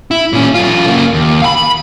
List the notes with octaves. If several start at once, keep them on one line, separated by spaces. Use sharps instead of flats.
E4
A#2 C#4
F#2 F4
C#3 A#3
D#2
F5 B5